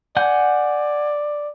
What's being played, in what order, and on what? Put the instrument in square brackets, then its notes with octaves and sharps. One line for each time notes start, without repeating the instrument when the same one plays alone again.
[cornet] D5 [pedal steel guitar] F#5 G#5 G6